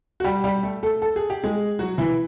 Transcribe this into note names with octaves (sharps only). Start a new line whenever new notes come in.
F#4
G3 G4
G3 G4
A3 A4
A3 A4
A4
G#4
G4
G#3 G#4
F#3 F#4
E3 E4